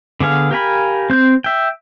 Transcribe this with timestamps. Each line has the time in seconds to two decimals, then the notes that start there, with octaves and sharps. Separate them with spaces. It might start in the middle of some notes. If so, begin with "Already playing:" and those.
0.20 D3 B3 G#4 F5
0.51 G4 A#4 F5 G#5 B5
1.10 C4 G6
1.44 E5 G5